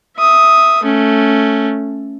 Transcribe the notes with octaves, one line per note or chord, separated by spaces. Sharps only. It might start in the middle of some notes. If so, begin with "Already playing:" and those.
E5 D#6
A3 C#4